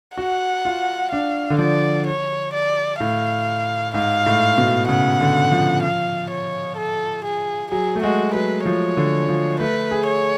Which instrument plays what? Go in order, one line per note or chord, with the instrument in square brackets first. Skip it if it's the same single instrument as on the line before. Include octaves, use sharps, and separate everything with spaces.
[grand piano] F#4 [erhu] F#5
[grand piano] F4
[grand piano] D4 [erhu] F5
[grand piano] D3
[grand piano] F3 [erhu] D5
[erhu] C#5
D5
[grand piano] A2 [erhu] F5
[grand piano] G#2 [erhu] F5
[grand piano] A2
B2
[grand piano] C#3 [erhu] F#5
[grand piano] D3
F3
[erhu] F5
C#5
A4
G#4
[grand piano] F#3 [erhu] G#4
[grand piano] A3
[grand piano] G#3 [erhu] F#4
[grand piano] F#3 [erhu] B4
[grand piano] F3 [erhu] C#5
[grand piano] D3
F3
[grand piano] A3 [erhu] B4
[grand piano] G#4
[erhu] C#5